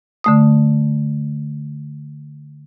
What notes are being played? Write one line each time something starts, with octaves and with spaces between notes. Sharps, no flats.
D3 A3 D#6